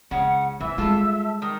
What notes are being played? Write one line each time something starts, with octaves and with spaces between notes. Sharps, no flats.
C#2 C#3 F#5
C3 E3 E5 E6
G3 G#3 F4 A4
D#3 D#6